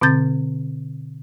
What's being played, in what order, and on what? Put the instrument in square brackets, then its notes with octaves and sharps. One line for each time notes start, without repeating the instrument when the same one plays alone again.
[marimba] B2 D3 C4 G6 A6